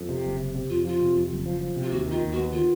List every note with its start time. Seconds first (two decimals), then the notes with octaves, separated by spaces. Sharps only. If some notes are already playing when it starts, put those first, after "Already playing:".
Already playing: F2
0.09 C3
0.24 F#1
0.40 C3
0.55 C3
0.70 F2 F4
0.85 F3 F4
1.00 C3
1.15 F2
1.31 F#1
1.46 F3
1.61 F3
1.76 C3
1.83 F4
1.91 D#2 F#4
2.06 D#3
2.11 F4
2.22 D#2
2.32 F#4
2.37 B3
2.52 D#3 F4